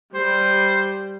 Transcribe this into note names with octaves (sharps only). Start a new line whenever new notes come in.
G3 C5